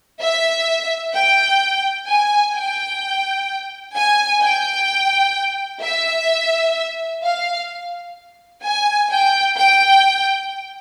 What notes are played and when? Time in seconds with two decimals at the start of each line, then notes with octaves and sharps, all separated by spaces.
0.21 E5
1.14 G5
2.08 G#5
2.55 G5
3.95 G#5
4.42 G5
5.83 E5
7.23 F5
8.64 G#5
9.11 G5
9.57 G5